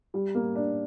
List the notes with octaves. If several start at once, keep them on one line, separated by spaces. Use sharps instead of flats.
G3
A#3
D4